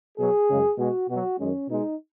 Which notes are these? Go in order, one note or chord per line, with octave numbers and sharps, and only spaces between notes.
B2 F#3 G#4
F#2 C#3 G#3
B2 G#3 F#4
B2 F#3 F#4
F#2 D#3 G#3 C#4
B2 G#3 D#4